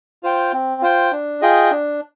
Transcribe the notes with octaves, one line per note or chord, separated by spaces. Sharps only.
F4 C5 G5
C4
F4 C5 G5
D4
F4 G#4 D#5 G5
D4